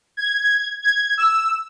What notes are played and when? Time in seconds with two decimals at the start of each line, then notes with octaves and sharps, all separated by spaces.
0.17 G#6
0.82 G#6
1.17 E6